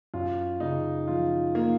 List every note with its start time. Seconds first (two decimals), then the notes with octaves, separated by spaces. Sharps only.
0.14 F#2 F4
0.60 C#3 D#4
1.07 F3 F4
1.55 A#3